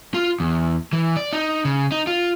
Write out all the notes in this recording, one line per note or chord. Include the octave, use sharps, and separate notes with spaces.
F4
E2
E3
D5
D#4
C#3
D#4
F4